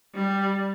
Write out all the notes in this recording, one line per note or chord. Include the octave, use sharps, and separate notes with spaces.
G3